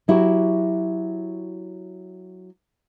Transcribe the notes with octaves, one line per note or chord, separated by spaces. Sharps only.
F#3 E4 F#4 G4